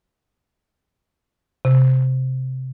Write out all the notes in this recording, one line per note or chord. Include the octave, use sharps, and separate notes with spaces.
C3